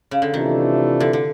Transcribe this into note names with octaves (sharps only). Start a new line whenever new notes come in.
C#3
D3
C3 D#3 E3 A3 D4 F4
D3
D3